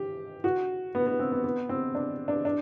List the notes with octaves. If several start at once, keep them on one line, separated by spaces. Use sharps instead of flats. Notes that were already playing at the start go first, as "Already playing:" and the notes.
Already playing: G4
F#4
B3
B3
C4
B3
B3
C4
D4
D4
D4